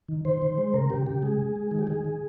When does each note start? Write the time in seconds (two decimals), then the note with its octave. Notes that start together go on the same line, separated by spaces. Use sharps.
0.08 D#3
0.25 D#3 C5
0.42 D#3
0.58 G#3
0.74 C#3 A#4
0.90 C#3 G4
1.06 C#3 G4
1.23 G#3 G#4
1.39 G#3
1.56 G#3
1.71 D#3 G#4
1.79 G4
1.87 D#3 G#4
2.04 D#3